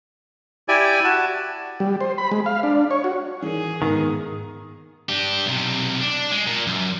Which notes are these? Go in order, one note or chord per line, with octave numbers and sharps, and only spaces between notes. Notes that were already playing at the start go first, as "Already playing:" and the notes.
E4 G4 D5 G#5
F#4 A5
G3
C5
B5
G#3
F5
D4
C#5
F#4
D#3 E3 G#4
G#2 D#3 A#3 B3
D4 G4
B1 C3
D4
G#3
A#2
F#2